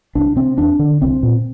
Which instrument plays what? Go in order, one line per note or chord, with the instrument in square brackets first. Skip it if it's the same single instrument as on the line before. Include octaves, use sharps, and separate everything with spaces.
[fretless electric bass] C2 D4
C3 C4
E2 D4
D3
C2 C4
A#2